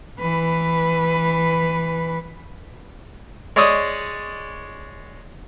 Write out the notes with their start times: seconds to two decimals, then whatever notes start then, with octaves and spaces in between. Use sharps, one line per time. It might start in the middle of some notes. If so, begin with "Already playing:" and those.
0.20 E3 B4
3.56 G#3 C#5 D5 D#6